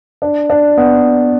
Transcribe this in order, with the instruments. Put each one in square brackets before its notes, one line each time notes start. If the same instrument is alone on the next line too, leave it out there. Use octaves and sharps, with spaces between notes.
[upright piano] D4
D4
B3